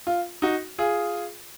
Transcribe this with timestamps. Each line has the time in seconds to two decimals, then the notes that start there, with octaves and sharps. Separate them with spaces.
0.07 F4
0.42 D#4 F#4
0.79 F4 G#4